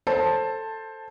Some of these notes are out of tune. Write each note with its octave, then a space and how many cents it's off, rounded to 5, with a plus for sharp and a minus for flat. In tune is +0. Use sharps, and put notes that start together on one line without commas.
A4 +10 C5 +10 A5 +0